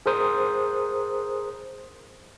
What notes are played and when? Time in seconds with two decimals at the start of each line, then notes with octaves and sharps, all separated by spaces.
0.06 G#4 A#4 C5 D#6